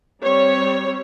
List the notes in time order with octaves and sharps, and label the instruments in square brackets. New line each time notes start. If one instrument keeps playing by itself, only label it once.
[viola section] G3 C4 C#5